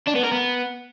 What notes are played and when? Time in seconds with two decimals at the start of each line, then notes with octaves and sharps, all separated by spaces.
0.08 D4
0.16 B3
0.24 A#4
0.32 B3